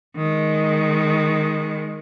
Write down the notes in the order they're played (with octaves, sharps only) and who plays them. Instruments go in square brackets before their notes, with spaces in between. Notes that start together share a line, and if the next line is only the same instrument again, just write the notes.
[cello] D#3 G#3